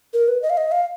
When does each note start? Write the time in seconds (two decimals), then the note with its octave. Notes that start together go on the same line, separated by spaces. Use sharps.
0.14 A#4
0.28 B4
0.42 D#5
0.50 F5
0.57 D#5
0.72 F5